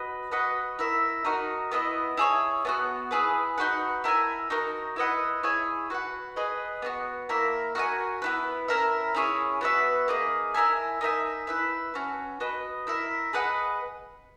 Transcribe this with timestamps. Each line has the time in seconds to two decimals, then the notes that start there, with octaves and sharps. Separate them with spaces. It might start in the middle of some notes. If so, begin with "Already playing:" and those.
Already playing: F#4 B4 D#5
0.31 F#4 B4 D#5 F#5
0.79 E4 A#4 E5
1.25 D#4 F#4 A#4
1.71 B3 E4 A#4 D#5
2.17 E4 G#4 C#5
2.65 B3 D#4 F#4
3.11 E4 G#4 B4
3.58 D#4 F#4 B4 F#5
4.04 E4 A#4 E5 G#5
4.50 D#4 F#4 A#4
4.96 E4 B4 D#5 F#5
5.43 E4 G#4 C#5 G#5
5.90 F#4 B4 F#5
6.36 G#4 B4 D#5 G#5
6.82 B3 D#4 F#4
7.29 A#3 E4 A#4 E5
7.75 F#4 A#4 E5 G#5
8.22 B3 E4 B4
8.68 C#4 E4 A#4 E5
9.15 C#4 E4 G#4 C#5
9.61 B3 F#4 B4 E5
10.08 A#3 D#4 G#4
10.54 E4 A#4 E5 G#5
11.01 D#4 A#4 E5 G#5
11.47 E4 B4 E5
11.94 C#4 F#4 B4
12.40 F#4 B4 D#5
12.87 E4 A#4 E5
13.33 G#4 B4 D#5 F#5